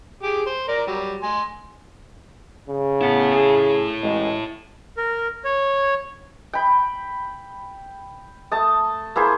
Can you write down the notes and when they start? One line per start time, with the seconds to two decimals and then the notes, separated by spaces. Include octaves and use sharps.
0.22 G4 G#4 D6
0.46 C5
0.68 A#4 D5 A#5
0.87 F#3 G3
1.23 G#5 C6
2.69 C#3
3.01 B3 E4 A4
3.34 G#4
4.03 A1 G#3
4.97 A#4
5.45 C#5
6.53 G5 B5
8.51 A3 A5 D#6
9.16 A#3 E4 G#4 C5